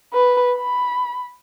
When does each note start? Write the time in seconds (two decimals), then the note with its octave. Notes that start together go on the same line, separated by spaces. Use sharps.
0.13 B4
0.57 B5